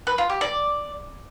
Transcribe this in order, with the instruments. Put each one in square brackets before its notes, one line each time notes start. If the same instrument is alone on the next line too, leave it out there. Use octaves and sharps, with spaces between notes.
[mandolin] B4
F4
G4
D5